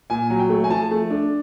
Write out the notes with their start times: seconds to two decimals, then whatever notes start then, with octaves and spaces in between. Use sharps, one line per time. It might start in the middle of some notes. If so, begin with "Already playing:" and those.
0.10 A#2 G#5
0.30 F#3
0.39 G5
0.49 A3
0.64 G#5
0.70 F3 A5
0.91 A3
1.10 D4